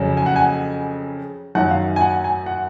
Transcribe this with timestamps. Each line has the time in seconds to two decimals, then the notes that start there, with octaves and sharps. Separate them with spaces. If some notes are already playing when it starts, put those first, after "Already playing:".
Already playing: F2 C#3 F#3
0.17 G#5
0.26 F#5
0.36 G#5
1.55 F#2 D#3 F#3 F#5
1.71 F5
1.96 G#5
2.01 F#5
2.24 G#5
2.46 F#5